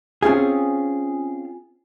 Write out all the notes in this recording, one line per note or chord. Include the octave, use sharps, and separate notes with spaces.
C4 C#4 F4 G#4